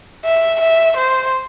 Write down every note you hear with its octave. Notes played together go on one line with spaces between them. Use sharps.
E5
E5
C5